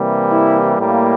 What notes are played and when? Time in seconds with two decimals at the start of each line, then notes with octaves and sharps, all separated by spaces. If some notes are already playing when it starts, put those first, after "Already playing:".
Already playing: C3 E3 G3 A#3
0.32 E4
0.79 A2 G3 A#3